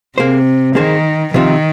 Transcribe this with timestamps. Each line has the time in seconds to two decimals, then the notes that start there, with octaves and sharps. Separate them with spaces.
0.17 C3 A#3 G#4 C5
0.75 D#3 A#3 G#4 C5
1.34 C3 D#3 F3 C4 F4